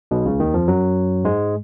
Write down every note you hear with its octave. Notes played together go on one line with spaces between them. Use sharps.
B1 B2
C#2 C#3
D#2 D#3
F2 F3
F#2 F#3
G#2 G#3